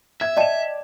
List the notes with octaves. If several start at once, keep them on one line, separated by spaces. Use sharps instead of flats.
E5 G#6
D5 D#5 G5 A5 E7